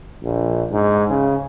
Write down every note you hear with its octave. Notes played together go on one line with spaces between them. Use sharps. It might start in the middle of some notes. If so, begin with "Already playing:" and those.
A#1
G#2
C#3